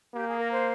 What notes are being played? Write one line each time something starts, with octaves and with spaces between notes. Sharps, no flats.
A#3 G4
G#4
A#4
C5